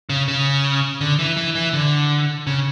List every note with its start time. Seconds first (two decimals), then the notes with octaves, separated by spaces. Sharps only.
0.09 C#3
0.28 C#3
1.01 D3
1.19 E3
1.37 E3
1.55 E3
1.73 D3
2.47 C#3